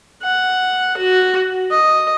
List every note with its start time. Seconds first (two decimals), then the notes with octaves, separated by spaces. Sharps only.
0.23 F#5
0.97 F#4
1.71 D#5